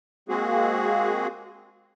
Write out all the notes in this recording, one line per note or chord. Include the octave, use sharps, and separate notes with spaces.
G#3 A#3 C4 F#4 G#4